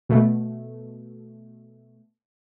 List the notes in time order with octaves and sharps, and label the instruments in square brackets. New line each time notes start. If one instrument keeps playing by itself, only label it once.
[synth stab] B2 A3